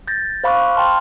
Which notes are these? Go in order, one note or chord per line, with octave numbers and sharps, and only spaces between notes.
G6 A6 A#6
C5 F5 B5 C#6 D6 F#6
G5 A5 C6 F6